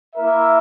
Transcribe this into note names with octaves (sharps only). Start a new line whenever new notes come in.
A#3 E4 A#4 E5